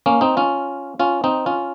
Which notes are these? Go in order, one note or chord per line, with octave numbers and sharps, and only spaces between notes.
A#3 C#4
C4 D#4
C#4 F4
C#4 F4
C4 D#4
C#4 F4